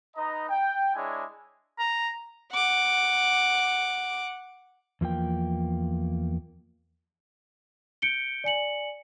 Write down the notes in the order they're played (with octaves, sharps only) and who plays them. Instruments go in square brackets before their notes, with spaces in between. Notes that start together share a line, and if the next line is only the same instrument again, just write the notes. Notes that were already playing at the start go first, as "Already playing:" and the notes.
[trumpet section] D#4 B4 D#5 A#5
G5
G#3 D4 E4 C#5 G#5
[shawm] A#5
[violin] F#5 D6
[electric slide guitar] E2 F3 A#3 G5
[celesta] G6 C#7 D7 G7
D5 G#5 C#7 F#7